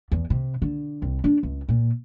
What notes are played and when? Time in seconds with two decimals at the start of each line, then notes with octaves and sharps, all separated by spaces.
0.12 E2
0.30 C3
0.62 D3
1.02 C2
1.24 D4
1.43 C#2
1.69 A#2